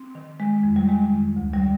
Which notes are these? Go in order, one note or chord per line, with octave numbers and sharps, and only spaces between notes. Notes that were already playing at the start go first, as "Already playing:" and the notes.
Already playing: C4
D#3
D#3 G#3
F2
G3
D#3 G#3
F2
D2
G3
D3